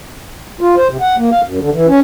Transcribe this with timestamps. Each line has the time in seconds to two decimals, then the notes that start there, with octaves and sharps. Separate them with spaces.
0.61 F4
0.77 C5
0.89 C3
1.01 F#5
1.18 A#3
1.31 F5
1.43 F#2
1.60 D3
1.72 E3
1.87 C#4